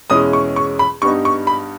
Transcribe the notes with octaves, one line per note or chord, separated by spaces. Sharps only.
E2 B2 G#3 C#4 E4 D#6
C#6
C#6
B5
G2 G3 B3 D#4 C#6
C#6
B5